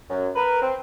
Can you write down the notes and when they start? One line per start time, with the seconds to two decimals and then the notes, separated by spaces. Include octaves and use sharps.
0.10 F#2
0.35 A#4 B4
0.62 C4